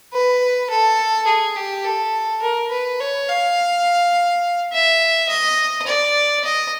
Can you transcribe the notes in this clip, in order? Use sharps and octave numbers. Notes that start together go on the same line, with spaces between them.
B4
A4
G#4
G4
A4
A#4
B4
C#5
F5
E5
D#5
D5
D#5